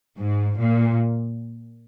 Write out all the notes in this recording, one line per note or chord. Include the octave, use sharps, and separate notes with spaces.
G#2
A#2